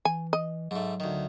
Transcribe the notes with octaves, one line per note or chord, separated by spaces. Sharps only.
E3 G#5
D#5
G#2 F#3 A3
D2 D#3